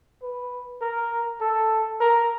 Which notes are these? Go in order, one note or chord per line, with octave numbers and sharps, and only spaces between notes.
B4
A#4
A4
A#4